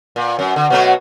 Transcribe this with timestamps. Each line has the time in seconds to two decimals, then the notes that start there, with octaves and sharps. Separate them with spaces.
0.16 A#2
0.39 F#2
0.56 D3
0.70 B2 F#3 A3